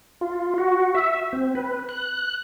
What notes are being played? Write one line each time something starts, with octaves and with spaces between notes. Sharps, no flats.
F4
F#4
E5
C4
B4
F#6